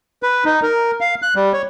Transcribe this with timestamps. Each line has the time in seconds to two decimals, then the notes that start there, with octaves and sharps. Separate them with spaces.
0.23 B4
0.45 D#4
0.63 A#4
1.01 F5
1.22 F#6
1.36 G3
1.53 C#5